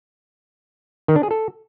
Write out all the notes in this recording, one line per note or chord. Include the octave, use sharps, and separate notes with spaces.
D#3
D4
G#4
A4